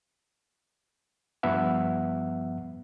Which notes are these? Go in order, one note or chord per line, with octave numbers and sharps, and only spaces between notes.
G2 F3 B3 E5 F#5